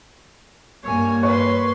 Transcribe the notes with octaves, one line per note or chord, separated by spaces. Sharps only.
G2 A#3 C#5 G#5
B4 C#5 C6